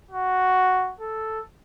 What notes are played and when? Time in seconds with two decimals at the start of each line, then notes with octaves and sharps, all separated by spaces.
0.11 F#4
1.00 A4